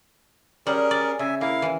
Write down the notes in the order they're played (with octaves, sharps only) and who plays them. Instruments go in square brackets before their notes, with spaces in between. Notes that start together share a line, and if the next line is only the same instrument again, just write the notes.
[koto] G3 F#5 [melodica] C#4 G#4 A#4
[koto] D5
[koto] C#3 [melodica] E5 G#5
[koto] A#3 [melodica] E4 F5
[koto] E3